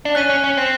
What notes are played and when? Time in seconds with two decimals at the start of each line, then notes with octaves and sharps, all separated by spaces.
0.05 D4
0.15 C#4 F#6 B6 D#7
0.29 C#4
0.44 C#4
0.57 C4